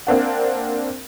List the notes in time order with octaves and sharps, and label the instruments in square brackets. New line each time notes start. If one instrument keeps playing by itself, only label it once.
[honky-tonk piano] A#3 C4 D4 F#5